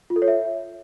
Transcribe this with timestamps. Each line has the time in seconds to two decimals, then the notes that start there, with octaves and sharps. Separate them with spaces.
0.10 F4
0.16 A4
0.22 C#5
0.28 E5